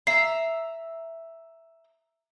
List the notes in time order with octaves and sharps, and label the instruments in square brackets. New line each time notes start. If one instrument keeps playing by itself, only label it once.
[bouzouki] E5 A#5 [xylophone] C7